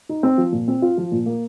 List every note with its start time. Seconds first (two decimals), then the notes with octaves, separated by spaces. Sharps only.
0.09 D#4
0.23 C4
0.38 F3
0.52 A#2
0.68 C4
0.82 F4
0.98 F3
1.12 A#2
1.26 A#3